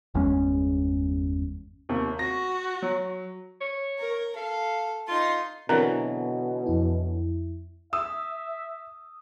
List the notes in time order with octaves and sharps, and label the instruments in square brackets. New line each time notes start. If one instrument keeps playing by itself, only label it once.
[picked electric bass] G1 E2 G#3 C#4
[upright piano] D#2 C3
[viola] F#4 [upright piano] A#6
[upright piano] F#3
[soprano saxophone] C#5
[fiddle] A#4
[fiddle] A4 [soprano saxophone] F5
[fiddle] D#4 C6 [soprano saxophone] F4
[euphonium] B2 [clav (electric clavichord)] D3 E3 F#3 [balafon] C4 A#4 A#5
[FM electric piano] F2 E4
[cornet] E5 [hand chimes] D#6 [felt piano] E6